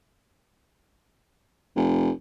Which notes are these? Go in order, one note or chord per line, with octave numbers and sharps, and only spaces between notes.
F1